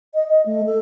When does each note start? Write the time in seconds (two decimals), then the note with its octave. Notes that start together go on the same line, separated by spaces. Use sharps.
0.14 D#5
0.28 D#5
0.46 A3
0.66 A4